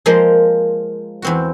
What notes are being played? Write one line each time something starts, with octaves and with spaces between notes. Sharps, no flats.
F3 G#3 A#3 A#4 C5
E2 C4 F#4